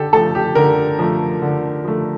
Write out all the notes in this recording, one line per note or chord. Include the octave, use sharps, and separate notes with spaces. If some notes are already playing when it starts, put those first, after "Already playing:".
Already playing: D3 G4 A4
F3 A3 A4
G4
D3 A#4
F3 A3
D3
F3 A3